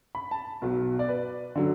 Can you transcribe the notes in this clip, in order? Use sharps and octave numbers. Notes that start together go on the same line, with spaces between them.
B5
A5
B1 B2 F#3
D5
B4
D3 F#3